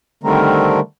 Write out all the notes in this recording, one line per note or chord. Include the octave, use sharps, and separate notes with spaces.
D3 D#3 G3 A3 C4 A#4